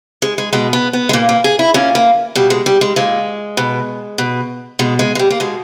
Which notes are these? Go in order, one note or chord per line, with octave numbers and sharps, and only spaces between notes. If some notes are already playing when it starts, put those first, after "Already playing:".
G#3
G#3
B2 G#3
B3
B3
G#3
A#2 A#3
A#3
G#4
E4
A#2 C#4
A#3
B2 G3
G#3
G3
G#3
A#2 G#3
B2
B2
B2 G#3
G#3
G#3
G3
A#3
B2 G#3